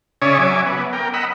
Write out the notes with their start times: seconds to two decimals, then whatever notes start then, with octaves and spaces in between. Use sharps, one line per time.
0.22 C#3 C#4 C#5 D5 E5 D#6
0.39 F#3 E5 G#5 D6
0.66 B3
0.93 A#4 G5
1.14 D#5 F#5 B5 E6